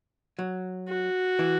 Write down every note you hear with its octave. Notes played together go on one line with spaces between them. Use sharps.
F#3
F#4
E3